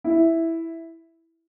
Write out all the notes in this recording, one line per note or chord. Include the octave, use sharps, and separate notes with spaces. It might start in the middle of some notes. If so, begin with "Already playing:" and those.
E4